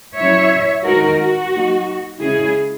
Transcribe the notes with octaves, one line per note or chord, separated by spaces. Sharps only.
F#3 C#4 E4 C#5 E5
D#3 G#3 D#4 F#4 A#4
F#4
F#3 A#3 D#4
C#3 G#3 C#4 E4 G#4